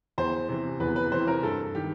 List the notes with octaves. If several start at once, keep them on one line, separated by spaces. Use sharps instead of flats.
E2 C5
C3 E3
E2 B4
B4
C3 E3 C5
A#4
G2 A4
D#3 G4